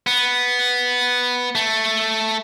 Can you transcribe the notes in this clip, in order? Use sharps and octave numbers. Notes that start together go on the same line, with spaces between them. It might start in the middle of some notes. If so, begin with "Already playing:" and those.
B3
A3